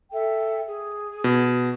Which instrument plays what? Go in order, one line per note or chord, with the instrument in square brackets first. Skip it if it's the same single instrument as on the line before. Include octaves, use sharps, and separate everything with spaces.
[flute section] A4 E5 G5
G#4
[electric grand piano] B2